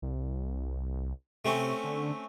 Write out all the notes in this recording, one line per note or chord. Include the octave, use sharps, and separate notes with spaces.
C2
C3 A3 C4 C#4
D3